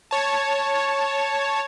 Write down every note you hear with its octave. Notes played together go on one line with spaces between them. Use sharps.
C#5 A5